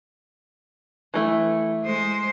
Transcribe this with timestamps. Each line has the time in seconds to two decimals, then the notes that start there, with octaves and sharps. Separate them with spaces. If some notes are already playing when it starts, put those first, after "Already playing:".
1.14 E3 A3 E4
1.84 G#3 C5